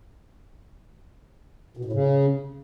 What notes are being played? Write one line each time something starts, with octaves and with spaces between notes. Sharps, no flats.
B2
A2
C#3